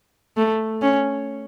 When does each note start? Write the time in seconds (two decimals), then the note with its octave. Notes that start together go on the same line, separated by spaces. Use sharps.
0.37 A3
0.82 C#4